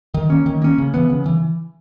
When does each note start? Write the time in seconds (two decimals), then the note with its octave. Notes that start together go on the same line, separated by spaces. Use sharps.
0.14 D#3
0.30 A#3 C#4
0.46 D#3
0.62 A#3 C#4
0.78 C#3
0.94 E3 B3
1.10 C#3
1.26 E3